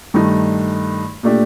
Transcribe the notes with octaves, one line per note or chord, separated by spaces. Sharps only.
G2 D#3 A3 D#4
A#2 A3 D4 G4